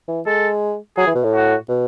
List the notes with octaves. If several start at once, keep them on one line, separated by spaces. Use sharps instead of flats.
E3
G#3 A4
F#3 G#4
E3
B2
A2
F#4
B2